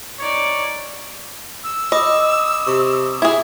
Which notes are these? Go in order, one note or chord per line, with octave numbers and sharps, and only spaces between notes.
D#4 C#5 D5
E6
D#5 B5 D6 D#6
C3 C#6
E4 G#4 G#6